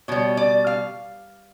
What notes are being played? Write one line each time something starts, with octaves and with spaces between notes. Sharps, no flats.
B2 G3 C#5
D5
F5